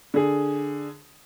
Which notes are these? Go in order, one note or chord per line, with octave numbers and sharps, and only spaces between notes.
D3 G#4